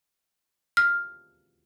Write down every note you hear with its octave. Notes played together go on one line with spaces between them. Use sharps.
F6